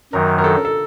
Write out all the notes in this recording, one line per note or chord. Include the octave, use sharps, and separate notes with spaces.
F#2 D#3 F#3 A#4
A#4
A4
A4